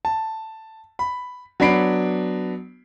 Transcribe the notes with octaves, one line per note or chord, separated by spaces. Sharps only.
A5
B5
F#3 B3 D4 B5 C7 D7